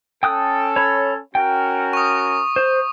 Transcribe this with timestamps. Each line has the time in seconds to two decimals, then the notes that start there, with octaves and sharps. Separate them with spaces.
0.23 C#4 A4 G5 D#6 F#6
0.76 C#5 B5
1.35 C#4 F#4 A#4 G5
1.93 C#6 D#6
2.56 C5